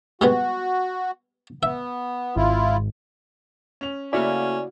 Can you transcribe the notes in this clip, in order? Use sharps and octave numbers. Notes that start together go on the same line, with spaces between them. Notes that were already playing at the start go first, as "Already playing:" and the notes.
G3 G#3 B3 F#4
B3 E5
G#1 E4 F4
C#4 F7
C#3 A3 A#3 C#4 E4 F#4 D5 F5